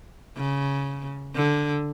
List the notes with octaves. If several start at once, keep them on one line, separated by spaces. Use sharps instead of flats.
C#3
D3